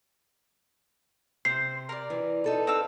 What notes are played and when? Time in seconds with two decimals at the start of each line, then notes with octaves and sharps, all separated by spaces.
1.45 C3 C5 C7
1.89 A#4 D5
2.10 E3
2.44 D#4 A4 B4
2.67 C4 F5 E6